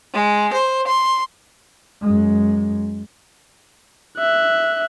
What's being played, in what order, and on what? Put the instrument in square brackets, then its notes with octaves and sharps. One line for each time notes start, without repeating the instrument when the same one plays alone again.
[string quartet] G#3
C5
C6
[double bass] F#2 G#3
[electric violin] E5 F#6